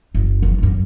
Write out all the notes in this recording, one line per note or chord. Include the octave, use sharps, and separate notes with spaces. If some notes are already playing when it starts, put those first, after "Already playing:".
F#1
E2
G1 F#2